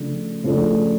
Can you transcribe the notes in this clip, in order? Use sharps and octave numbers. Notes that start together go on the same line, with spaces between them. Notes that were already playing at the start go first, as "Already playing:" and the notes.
Already playing: C#3 F3 A3 D4
C#3 F3 A3 D4